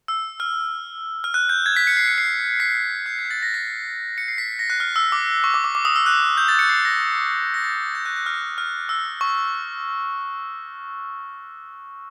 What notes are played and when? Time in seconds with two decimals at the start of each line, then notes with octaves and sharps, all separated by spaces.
0.08 E6
0.40 F6
1.24 F6
1.34 F#6
1.49 G6
1.66 G#6
1.76 B6
1.87 C#7
1.97 C7
2.08 C#7
2.18 C7
2.60 B6
3.06 G6
3.19 G#6
3.31 A6
3.43 A#6
3.54 B6
4.18 C#7
4.28 C7
4.38 B6
4.59 A#6
4.70 F#6
4.80 F6
4.96 E6
5.12 D6
5.44 C#6
5.54 D6
5.64 D6
5.75 D6
5.85 D#6
5.96 E6
6.06 F#6
6.37 G6
6.48 A6
6.59 C#7
6.69 C7
6.85 A#6
7.54 A#6
7.64 A6
7.95 G6
8.05 F#6
8.16 F#6
8.26 F6
8.58 F6
8.89 E6
9.21 C#6